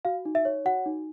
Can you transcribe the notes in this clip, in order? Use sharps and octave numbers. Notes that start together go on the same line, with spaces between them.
F#4 F5
D#4
E5
C#5
F#4 F#5
D#4